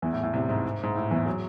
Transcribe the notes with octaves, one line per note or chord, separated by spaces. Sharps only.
E2 E3
A2
A2
C2 C3
G#2
G#2
A2
E2 E3
F#3